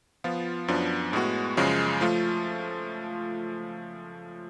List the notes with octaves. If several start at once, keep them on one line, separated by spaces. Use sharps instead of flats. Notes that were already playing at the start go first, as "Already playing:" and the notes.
F3 B3 F4
F#2 F3 B3 D4
A2 G#3 B3 F#4
F#2 C#3 F3 G#3
F3 A3 F4